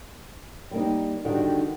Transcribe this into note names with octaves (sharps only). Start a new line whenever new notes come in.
G3 A#3 D#4
D3 D#3 G3 D#4 F#4 G4